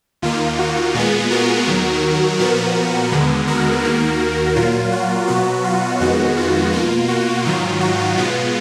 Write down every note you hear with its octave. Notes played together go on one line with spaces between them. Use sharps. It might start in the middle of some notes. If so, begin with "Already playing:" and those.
D#2 D#3 A#3 F4
F#4
A#2 G#3 B3 F4 G#4
F#4 A#4
D#2 D#3 F#3
A#2 F3 B3 F#4 A#4
D#2 D3 G#3 B3
F#4 A#4
D#2 D#3 A#3
A#2 F#3 A#3 F4
F#4
B2 F#3 B3 F#4
F4
F2 D#3 G#3 B3 F#4
F4
B2 A#3 F4
F#4
G#2 D#3 F#3 F4
F#4
B2 G#3 B3 F4